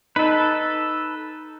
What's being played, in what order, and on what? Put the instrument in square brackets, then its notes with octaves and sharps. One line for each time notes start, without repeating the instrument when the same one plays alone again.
[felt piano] D#4 [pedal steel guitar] A4 B4